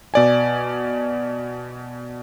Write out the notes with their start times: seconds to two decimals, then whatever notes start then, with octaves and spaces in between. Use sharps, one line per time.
0.14 B2 D5 G#5